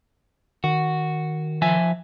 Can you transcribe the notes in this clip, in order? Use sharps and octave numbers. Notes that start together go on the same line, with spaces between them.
D#3 F#4
F3 E5 G#5